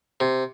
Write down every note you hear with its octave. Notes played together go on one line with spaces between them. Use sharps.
C3